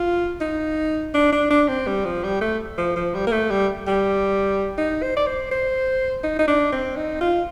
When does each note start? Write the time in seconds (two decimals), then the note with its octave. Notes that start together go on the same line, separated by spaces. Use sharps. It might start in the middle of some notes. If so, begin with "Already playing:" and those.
Already playing: F4
0.41 D#4
1.14 D4
1.32 D4
1.50 D4
1.68 C4
1.87 G3
2.05 F3
2.23 G3
2.41 A3
2.78 F3
2.96 F3
3.14 G3
3.27 A#3
3.32 A3
3.50 G3
3.87 G3
4.78 D#4
5.02 C5
5.17 D5
5.27 C5
5.51 C5
6.23 D#4
6.39 D#4
6.47 D4
6.72 C4
6.96 D#4
7.21 F4